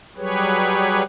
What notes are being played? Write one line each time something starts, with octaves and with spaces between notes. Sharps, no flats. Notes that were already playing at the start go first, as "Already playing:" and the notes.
F#3 G3 G4 G#4 B4 C#5